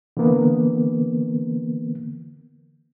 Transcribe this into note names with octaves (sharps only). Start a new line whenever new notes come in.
D3 E3 A#3 B3